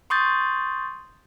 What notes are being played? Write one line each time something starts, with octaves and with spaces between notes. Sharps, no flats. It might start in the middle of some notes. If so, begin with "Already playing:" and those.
C6 C#6 D#6 G6 A6